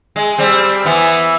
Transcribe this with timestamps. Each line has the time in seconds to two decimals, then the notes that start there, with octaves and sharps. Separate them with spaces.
0.16 G#3
0.38 G3 C4
0.85 E3 B3